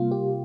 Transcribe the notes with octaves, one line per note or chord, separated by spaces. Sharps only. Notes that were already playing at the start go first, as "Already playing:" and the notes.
Already playing: C3 G3 A#3 F4
G4